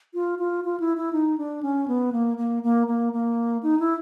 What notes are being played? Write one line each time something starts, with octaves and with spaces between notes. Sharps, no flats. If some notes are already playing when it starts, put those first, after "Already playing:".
F4
F4
F4
E4
E4
D#4
D4
C#4
B3
A#3
A#3
A#3
A#3
A#3
D#4
E4